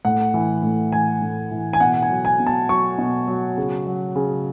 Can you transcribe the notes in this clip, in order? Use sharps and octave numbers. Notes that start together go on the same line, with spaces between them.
A2 F#5
E3
A2
E3 G#5
A2
E3
G#5
B2 F#5
G#5
F#3
G#5
B2
A5
F#3 C#6
B2
F#3
C#3
F#3
C#3